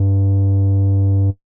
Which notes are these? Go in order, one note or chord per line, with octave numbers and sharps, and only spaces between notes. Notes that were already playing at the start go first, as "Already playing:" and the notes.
Already playing: G2